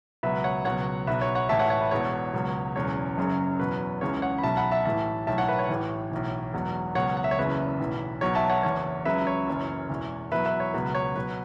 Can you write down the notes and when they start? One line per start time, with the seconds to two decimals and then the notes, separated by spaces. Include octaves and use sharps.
0.23 C#2 B2 F#3 B4 E5
0.44 C#5 F#5
0.65 C#2 B2 F#3 C#5 F#5
1.07 B1 B2 F#3 B4 E5
1.21 C#5
1.35 C#5 F#5
1.49 A1 A2 E3 E5 A5
1.59 C#5 F#5
1.70 C#5 F#5
1.81 B4 E5
1.91 E1 E2 B2 C#5
2.33 C#2 B2 F#3
2.75 E1 E2 C#3 F#3 C#5
3.17 F#1 F#2 C#3 F#3
3.59 E2 B2 F#3 B4
4.01 C#2 C#3 E3 C#5
4.22 C#5 F#5
4.38 B5
4.43 B1 B2 F#3 E5 A5
4.57 F#5 B5
4.71 E5 A5
4.85 A1 A2 E3 E5 A5
5.27 B1 A2 F#3 E5 A5
5.38 C#5 F#5
5.49 B4 E5
5.59 C#5
5.69 A1 A2 E3 C#5
6.12 B1 A2 E3
6.53 E1 E2 B2 F#3
6.95 C#2 B2 F#3 C#5 F#5
7.17 F#5
7.24 E5
7.31 C#5
7.38 F#1 E2 C#3 F#3 B4 E5
7.79 B1 A2 E3
8.21 B1 B2 F#3 C#5
8.35 E5 A5
8.50 C#5 F#5
8.63 F#1 E2 E3 C#5
9.05 C#2 C#3 F#3 B4 E5
9.27 C#5
9.48 F#1 F#2 E3
9.90 E1 E2 E3
10.31 E2 B2 F#3 B4 E5
10.46 B4 E5
10.60 C#5
10.74 C#2 B2 F#3 B4
10.95 C#5
11.15 B2 F#3 B4